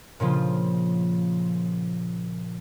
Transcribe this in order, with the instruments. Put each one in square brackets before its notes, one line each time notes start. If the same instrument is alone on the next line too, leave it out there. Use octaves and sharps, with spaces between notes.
[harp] A#2 C#3 F3 F4